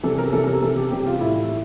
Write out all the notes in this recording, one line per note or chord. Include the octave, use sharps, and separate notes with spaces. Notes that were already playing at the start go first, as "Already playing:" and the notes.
C3 E3 G3 A4
A#4
C3 E3 G3 A4
A#4
C3 E3 G3 A4
G4
C3 E3 G3 G4
F4
A2 G3 E4